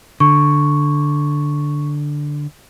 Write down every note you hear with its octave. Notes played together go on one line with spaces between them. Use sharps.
D3 C#6